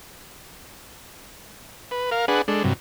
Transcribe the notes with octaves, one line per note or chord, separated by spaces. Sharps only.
B4
A#4 F5
D4 G#4 B4 F#5
G#3 D4 A4
G2 C3 F#3